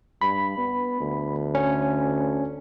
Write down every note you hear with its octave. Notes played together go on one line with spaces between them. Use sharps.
G2 B5
B3
D2
C#4